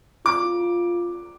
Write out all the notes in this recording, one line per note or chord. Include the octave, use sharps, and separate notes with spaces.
F4 D6
F4
F4